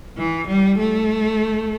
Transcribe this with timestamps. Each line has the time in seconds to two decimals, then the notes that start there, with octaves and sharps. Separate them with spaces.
0.18 E3
0.48 G3
0.79 A3